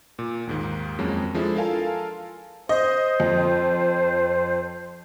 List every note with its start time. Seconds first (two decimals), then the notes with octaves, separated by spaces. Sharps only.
0.19 A#2
0.47 D#2 G#2 D#3
0.98 F2 F#3 G#3 A#3 C#4
1.34 F3 G#3 D4 E4 A4
1.56 F4 A4 A#4 F5 G#5 A5
2.69 C5 D#5
3.20 F2